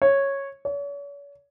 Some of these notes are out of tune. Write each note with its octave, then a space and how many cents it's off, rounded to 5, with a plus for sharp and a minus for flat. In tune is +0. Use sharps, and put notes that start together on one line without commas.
C#5 -10
C#5 +40